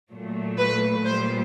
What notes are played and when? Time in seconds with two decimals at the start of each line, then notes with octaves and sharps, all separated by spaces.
0.11 A#2 F#3 A3
0.58 B4
1.05 A#2 G3 C5